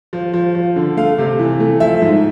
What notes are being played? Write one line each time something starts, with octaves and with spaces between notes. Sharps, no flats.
F3
F3
F3
D3
A3 F5
C3
E3
A3
F3 E5
G#2